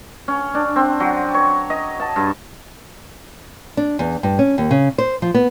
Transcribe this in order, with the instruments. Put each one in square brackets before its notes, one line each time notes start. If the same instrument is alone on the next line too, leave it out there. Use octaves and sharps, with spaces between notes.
[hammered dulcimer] C#4
D4
C4
F#3
C#5
D#5
A5
G2
[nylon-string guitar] D4
E2
G2
C#4
D#2
C#3
C5
F3
B3